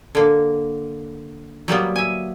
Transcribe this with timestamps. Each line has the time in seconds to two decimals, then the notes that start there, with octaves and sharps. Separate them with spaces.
0.15 D3 A#3
1.68 F#3 G3 A#3 B3
1.96 E5 G#5